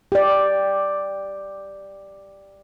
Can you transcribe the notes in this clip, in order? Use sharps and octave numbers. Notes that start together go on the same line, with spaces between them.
G4 D5